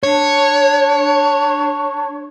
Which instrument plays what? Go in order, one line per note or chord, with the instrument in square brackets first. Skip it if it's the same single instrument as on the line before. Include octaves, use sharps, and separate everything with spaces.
[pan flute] D4 [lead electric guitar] C#5